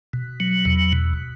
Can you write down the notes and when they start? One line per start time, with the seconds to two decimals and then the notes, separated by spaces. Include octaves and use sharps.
0.13 B2
0.40 F#3
0.65 E2
0.92 B2